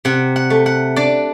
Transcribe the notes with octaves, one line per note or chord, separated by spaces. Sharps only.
C3 F#5
F#5
A3
F#5
D4 D5